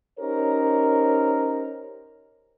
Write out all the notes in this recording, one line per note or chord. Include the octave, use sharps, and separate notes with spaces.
C#4 D#4 G4 A#4 C5 C#5